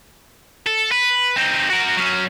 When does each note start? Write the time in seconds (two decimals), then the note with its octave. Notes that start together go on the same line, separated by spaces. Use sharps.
0.66 A4
0.91 B4
1.36 C4 D#4
1.70 F#4 A#4
1.97 F#3 C#4